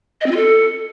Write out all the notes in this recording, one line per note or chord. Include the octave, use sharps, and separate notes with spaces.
D#5
C4
F4
A4